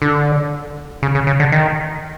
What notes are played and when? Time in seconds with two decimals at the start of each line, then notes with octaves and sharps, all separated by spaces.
0.02 D3
1.03 C#3
1.15 C#3
1.27 C#3
1.40 D3
1.52 D#3